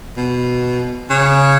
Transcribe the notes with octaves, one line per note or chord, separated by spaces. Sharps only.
B2
C#3